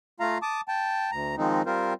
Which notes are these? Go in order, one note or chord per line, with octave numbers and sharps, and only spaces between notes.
A3 F4 F5 A#5
A5 D6 D#6
G5 A5
D2 A#5
D#3 F3 G#3 C4 D#4
G3 C4 F4 A#4 C5